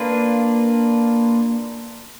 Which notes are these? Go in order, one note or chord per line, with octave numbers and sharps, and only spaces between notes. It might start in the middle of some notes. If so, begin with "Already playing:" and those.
Already playing: A#3 D4 F4 B4